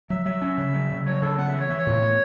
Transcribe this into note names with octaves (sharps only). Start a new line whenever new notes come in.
F#3 E5
F#3 E5
C#4
C#3
F#3
C#3
F#3 C#5
C#3 A4
B3 F#5
E5
E3
C#5
E3 E5
C#5
A2
B3